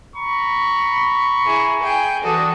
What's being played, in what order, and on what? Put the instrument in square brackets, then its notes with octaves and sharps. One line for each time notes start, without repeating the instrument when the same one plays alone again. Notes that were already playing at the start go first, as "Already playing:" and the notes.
[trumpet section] A#5 B5 C#6
[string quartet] E4 G#4
G#4 G5
[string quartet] E3 F#4 A4 [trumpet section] D4 D#6